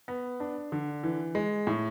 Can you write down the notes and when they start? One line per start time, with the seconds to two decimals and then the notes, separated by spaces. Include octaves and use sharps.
0.08 B3
0.40 D4
0.72 D3
1.03 E3
1.35 G#3
1.67 A2